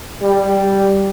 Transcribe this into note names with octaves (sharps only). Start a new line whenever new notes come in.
G3